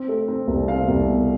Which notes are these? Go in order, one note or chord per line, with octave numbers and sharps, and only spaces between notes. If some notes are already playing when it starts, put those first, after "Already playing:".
Already playing: C4
A3
C4
C2
C4 F5
C2
B2